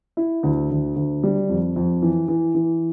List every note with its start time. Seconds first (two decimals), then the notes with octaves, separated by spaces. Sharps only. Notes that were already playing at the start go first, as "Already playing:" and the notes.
0.17 E4
0.43 D2
0.71 D2
0.96 D2
1.23 G3
1.49 F2
1.76 F2
2.02 E3
2.28 E3
2.55 E3